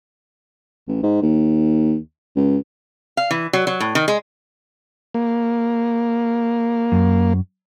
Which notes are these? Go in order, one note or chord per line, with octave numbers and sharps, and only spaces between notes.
A1
G#2
D#2
C#2
F5
E3
F#3
F#3
A2
D#3
G#3
A#3
F#2